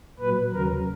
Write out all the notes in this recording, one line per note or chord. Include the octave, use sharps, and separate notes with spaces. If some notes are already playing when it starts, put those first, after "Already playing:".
A#2 F#3 B4
D#2 C#3 F#3 A#4